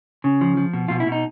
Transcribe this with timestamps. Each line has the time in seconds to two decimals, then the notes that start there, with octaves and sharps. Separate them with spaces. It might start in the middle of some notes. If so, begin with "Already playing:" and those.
0.24 C#3
0.41 F3
0.57 F3
0.73 B2
0.88 B2 F4
1.00 E4
1.07 B2
1.12 D#4